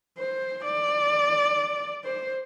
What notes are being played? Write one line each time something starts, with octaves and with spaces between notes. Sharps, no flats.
C5
D5
C5